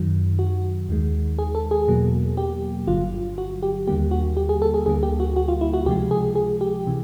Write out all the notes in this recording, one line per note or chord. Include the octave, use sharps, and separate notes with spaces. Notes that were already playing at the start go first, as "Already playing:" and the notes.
Already playing: F#2 D#3 F#3
F#4
D#2 D#3 G#3
G#4
A4
G#4
E2 B2 F#3 A#3
G4
G1 G2 D3 F#3 F4
F#4
G4
D#2 D3 G3 A#3 G4
F#4
G4
G#4
A4
G#4
D2 D3 G3 A#3 G#4
G4
F#4
F#4
F4
E4
F#4
C#2 C3 F3 G#3 G4
G#4
G#4
G4
C3 E3